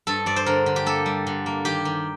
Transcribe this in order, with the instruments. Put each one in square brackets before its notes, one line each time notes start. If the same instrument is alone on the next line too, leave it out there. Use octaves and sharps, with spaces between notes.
[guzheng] G2 A4
G2 D5
C5
D3 A#4
D3
G4
A#3 A4
G3
D3
A#3
D#3 G4
D#3